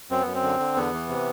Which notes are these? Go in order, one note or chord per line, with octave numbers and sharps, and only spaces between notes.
F#2 C4
F#2 B3
C4
D3
D3
E2 B3
E3
C3